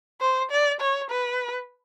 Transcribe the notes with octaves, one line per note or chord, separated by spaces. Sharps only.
C5
D5
C#5
B4